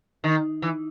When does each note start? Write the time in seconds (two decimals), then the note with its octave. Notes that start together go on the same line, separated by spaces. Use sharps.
0.24 D#3
0.62 E3